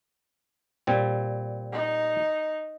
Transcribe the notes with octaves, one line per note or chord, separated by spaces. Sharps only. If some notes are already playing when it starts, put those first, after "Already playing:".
A#2 G3 C4
D#4